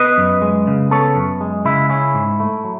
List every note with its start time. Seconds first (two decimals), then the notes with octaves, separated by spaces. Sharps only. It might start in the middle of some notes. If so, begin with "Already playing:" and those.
Already playing: B3 B4 D#5
0.18 F#2
0.42 G#3
0.67 C#3
0.91 B3 A4 C#5
1.16 F#2
1.41 G#3
1.65 C#3 E4
1.90 C#4 E4
2.14 G#2
2.40 A3
2.64 F#3